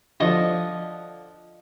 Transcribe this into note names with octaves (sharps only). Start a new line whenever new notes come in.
D3 F3 D#5 C#6 D#6